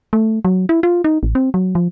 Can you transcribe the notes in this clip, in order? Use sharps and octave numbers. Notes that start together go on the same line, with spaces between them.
A3
F#3
E4
F4
D#4
A1
C4
F#3
F3